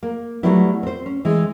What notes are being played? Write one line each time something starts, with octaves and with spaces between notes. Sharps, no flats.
A#3
F#3 G3 A3 B3 E4
C4 C5
C#4
E3 G#3 C4